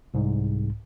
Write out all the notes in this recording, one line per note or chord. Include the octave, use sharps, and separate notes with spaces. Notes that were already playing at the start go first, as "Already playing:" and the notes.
C2 G#2